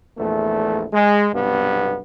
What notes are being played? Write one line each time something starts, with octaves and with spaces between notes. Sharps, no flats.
A#1 E2 A3
G#3
B1 G2 C3 B3